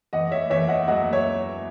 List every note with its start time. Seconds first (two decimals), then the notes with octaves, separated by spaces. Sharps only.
0.13 E2 D#5 F#5
0.31 C#5 E5
0.50 E2 C#5 E5
0.68 D#5 F#5
0.88 F#3 D#5 F#5
1.12 C#5 E5